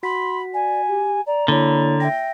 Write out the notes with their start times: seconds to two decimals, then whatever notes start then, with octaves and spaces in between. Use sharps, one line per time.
0.03 F#4 F#5 B5 C6 B6
0.53 D5 G#5
0.88 G4
1.26 D5 A#5
1.48 D3 A#3 E4 C#5 B5
2.00 E5 G5 A#6